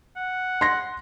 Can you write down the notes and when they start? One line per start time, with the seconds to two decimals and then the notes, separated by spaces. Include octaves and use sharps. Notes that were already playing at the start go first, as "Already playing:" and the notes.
0.16 F#5
0.61 C6 A#6